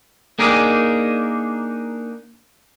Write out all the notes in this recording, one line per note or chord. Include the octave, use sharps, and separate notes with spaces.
A#3 D4 D#4 G#4 A#4